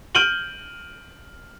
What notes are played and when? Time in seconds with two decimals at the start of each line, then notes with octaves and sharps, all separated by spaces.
0.15 F6 G6 D7 D#7 F#7 G7